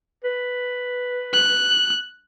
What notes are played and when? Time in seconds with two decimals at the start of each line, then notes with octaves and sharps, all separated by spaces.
0.24 B4
1.33 F#6